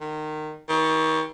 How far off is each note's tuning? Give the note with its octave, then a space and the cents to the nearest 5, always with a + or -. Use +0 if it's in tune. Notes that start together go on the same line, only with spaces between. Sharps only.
D#3 -20
D#3 +35